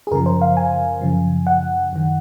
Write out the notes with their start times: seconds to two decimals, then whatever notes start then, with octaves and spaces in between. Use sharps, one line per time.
0.07 G#4
0.11 F#2 C#3 F3 A#4
0.26 C5
0.42 F5
0.57 G#5
1.01 F#2 C#3 F3
1.47 F#5
1.93 F#2 D#3